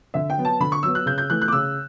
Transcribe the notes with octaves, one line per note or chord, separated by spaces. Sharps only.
D3 E5
G5
F#3 B3
A5
D3 B5
C#6
F#3 B3 E6
F#6
C#3 G6
G6
E3 A3 F#6
F#6
D6
C#3 E6